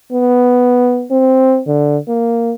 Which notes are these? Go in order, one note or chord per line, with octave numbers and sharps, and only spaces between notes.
B3
C4
D3
A#3